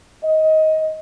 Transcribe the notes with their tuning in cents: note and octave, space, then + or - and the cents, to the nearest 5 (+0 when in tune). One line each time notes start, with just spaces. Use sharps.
D#5 +15